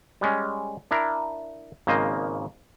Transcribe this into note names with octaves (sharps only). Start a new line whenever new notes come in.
G3 G#3 C#4
D4 E4 A#4
G#1 C#3 A#3 C5 D#5